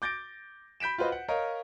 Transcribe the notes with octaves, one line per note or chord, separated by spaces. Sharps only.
D6 G6 A6 A#6 D7
B5 G6 B6 D7 E7
F4 F#4 B4 C5 D#5
F#5
A#4 C#5 D#5 F5